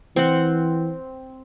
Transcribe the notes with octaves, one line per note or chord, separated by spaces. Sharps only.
E3 C4 F#5